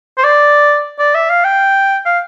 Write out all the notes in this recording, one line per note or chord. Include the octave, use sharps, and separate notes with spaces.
C5
D5
D5
E5
F5
G5
F5